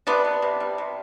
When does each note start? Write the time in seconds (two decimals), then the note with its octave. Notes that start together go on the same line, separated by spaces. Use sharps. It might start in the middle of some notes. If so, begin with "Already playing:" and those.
0.07 C3 B3 D4
0.25 B3
0.42 C3
0.60 G3
0.78 C3